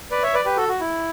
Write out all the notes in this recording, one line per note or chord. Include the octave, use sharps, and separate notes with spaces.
B4 D5
C#5 E5
B4 D5
G4 B4
F#4 A4
F#4
E4